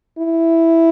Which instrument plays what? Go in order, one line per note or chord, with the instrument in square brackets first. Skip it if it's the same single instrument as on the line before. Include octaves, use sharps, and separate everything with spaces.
[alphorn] E4